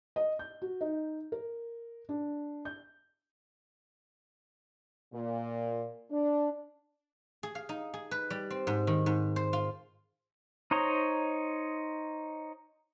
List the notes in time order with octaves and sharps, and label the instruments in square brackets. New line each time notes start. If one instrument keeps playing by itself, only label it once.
[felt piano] D#5
G6
F#4
D#4
A#4
D4
G6
[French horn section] A#2
D4
[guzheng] G#4
F5
D#4
G#4
B4
G3
C4
G#2
D#3
G#2
C5
F4
[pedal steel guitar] D#4 C5 C#5 D#5 A#5